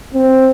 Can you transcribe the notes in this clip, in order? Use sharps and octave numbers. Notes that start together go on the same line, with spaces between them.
C4